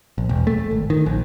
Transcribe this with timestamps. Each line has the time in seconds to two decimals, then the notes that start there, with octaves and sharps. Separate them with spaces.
0.18 A#1
0.29 E1
0.47 A3
0.71 G#1
0.90 D#3
1.06 A#1